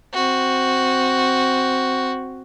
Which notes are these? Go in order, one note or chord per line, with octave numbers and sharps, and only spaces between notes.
C4 F#4